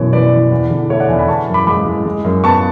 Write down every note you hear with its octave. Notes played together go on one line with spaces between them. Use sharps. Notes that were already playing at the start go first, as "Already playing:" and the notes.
Already playing: F#2 B2 E3 C#5
E3 B4 D5
E3
E2
D3
A3 C#5 E5
D5 F#5
E2 E5 G#5
G#5 B5
B3 A5 C#6
F#2
B5 D6
G#3 B5 D6
G#3
G#3
F#2
B3 A5 C#6